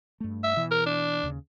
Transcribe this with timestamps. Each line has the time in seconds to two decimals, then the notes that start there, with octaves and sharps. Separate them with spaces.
0.20 G2 A3
0.43 E5
0.57 B2 E3
0.71 A#4
0.86 D4
1.23 D#2 C#3